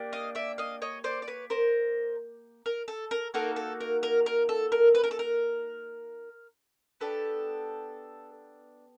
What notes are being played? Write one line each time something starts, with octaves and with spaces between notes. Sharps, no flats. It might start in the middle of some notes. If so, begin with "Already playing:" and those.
Already playing: A#3 D4 G4
D#5 F5
D5 E5
D#5 F5
C#5 D#5
C5 D5
D5
B4 C#5
A#4 C5
A#4
A4
A#4
A#3 D#4 F#4 A4 A#4
A4
A#4
A#4
A#4
A4
A#4
B4
A#4
A4
A#4
B3 D4 G4 A4